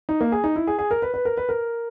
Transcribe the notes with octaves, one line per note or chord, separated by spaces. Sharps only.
D#4
A#3
G#4
D#4
E4
G#4
G#4
A#4
B4
B4
A#4
B4
A#4